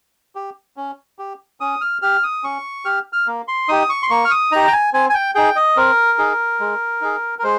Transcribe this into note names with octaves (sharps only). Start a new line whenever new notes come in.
G4
C#4
G4
C#4 D#6
F6
G4 F6
D#6
C#4 C#6
G4 F6
F6
A#3
C6
D#4 G4 D#6
C#6
C6
A#3 C#6
F6
D#6
D#4 G4 A#5
G5
G#5
C4 G#5
G#5
G5
D#4 G#4 G5
D#5
C4 A#4
D#4 G#4
G#3
D#4 G#4
A#4
G#3 C5